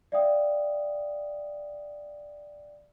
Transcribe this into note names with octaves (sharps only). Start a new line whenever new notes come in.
D5 E5 F5 G5 D#6